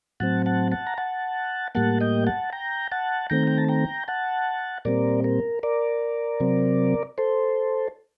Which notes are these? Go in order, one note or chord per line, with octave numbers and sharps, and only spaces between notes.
A2 F#3 C4 F#5 A5
F#5 A5
F#5 A5
A#5
F#5 A5
A2 G3 A#3 F#5 A5
D#5 G5
F#5 A5
G5 A#5
F#5 A5
D#3 A3 C4 G5 A#5
G5
A5
G5 A#5
F#5 A5
A#2 G3 C4 A#4 D5
A#4
A#4 D5
C3 F#3 C4
A4 C5